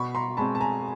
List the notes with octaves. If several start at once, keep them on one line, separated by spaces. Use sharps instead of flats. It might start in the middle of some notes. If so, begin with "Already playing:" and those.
Already playing: B2 B5 C#6
A#5 C6
G#3 C4 A5 B5
A5
G#5 A#5